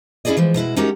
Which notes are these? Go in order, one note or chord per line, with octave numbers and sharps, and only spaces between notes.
C#4 E4 F4 G#4 D5 D#5
E3 F3 G#3
B2 G#3 E4 F#4
G#3 C#4 D#4 F#4 G4 A#4